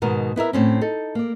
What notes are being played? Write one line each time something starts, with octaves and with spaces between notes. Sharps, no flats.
G#2 B2 D#3 B3 A#4
B3 E4 A#4 E5
A2 C4 C#4
D#4 A4
A#3 D5